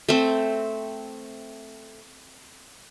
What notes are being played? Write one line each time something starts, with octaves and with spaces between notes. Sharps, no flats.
A3 C4